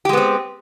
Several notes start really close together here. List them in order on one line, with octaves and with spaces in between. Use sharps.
G4 G#3 B3 C4